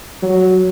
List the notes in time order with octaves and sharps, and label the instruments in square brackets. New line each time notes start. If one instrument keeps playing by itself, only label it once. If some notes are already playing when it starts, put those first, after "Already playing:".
[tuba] F#3